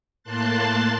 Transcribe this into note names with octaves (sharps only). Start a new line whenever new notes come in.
A2 A#3 A5 C6 F#6 A6